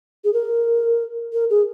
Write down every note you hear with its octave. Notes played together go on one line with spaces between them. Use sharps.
G#4
A#4
A#4
G#4